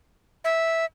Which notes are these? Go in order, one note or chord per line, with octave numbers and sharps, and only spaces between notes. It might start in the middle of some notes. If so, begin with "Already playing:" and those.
E5